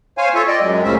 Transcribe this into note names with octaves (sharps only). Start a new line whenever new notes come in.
C5 C#5 F5 G#5
F4 A4 C#5 E5
D5 D#5 G5
F#2 F#3 G#3
D2 A#2 C#3 C4 C#4 E5